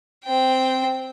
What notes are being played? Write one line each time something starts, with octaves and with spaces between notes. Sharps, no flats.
C4 G5